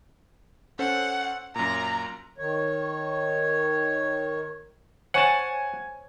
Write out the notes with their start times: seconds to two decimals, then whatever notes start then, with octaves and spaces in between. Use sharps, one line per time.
0.79 C#4 A4 C5 F#5
1.56 F#2 A#2 A#5
2.38 D#3 C#5
5.14 C5 C#5 F#5 G#5 A5 C#6